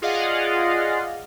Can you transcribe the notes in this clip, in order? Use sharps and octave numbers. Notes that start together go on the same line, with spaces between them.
F4 G#4 D5 D#5 F5 F#5